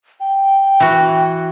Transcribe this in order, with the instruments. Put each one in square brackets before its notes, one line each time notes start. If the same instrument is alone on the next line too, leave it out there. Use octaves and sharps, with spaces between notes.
[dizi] G5
[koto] E3 F#4